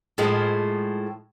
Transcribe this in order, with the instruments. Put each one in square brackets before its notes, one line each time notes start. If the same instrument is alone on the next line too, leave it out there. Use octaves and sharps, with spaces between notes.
[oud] A2 F3 G#3